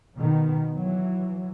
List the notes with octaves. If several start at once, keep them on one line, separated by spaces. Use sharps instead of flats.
B2 D#3 B3
E3 F#3